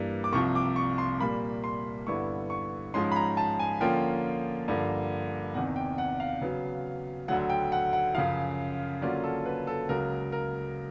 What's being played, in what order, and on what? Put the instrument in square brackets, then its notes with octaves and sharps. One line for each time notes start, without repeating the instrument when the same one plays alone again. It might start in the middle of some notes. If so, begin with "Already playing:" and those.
Already playing: [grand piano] G2 E3 G3 A#3
D6
C2 C3 F3 C#6
D6
C#6
C6
A#2 G3 A#3 B5
C6
G2 D3 G3 B3 E4 C#6
C#6
G#2 F3 G#3 C#4 C6
B5
A#5
A5
G#5
D3 F3 A#3 C#4 F4 G5
G2 D3 F3 A#3
E2 C3 D#3 F#5
G5
F#5
F5
C#3 F#3 B3
D2 D3 F#3 F#5
G5
F#5
F#5
F#2 C#3 F3 F5
D3 F#3 A#3 C#4 F4 D5
A4
B4
A4
C#2 C#3 F#3 A#4
A#4